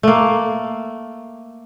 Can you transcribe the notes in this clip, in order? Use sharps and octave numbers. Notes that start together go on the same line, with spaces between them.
A3 A#3